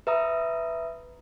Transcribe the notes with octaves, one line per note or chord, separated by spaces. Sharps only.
B4 E5 A#5 D#6